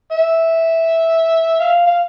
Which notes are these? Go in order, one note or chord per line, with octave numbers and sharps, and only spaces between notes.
E5
F5
F5